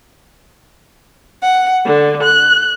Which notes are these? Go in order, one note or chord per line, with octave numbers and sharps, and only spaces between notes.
F#5
D3
F#6